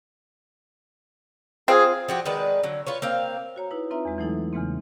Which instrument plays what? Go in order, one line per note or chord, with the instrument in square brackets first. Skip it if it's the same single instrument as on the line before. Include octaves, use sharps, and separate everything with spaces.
[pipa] C4 F4 [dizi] G#4
[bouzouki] F3 F#4 G4
D#3 G#3 B4 D5
D3 F#3
F4 B4 C#5
A#3 C4 F5
[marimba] F#4 C#5 A#5
D#4 E4 B4
C4 D#4 F4 B4 E5 A#5
E2 G#3
E3 F#3 A3 D#4 E4 A4
E2 C#3 E3 G#3 A#3 C4